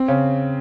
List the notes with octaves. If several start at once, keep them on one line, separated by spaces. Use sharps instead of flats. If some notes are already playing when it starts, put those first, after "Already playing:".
Already playing: C4
C#3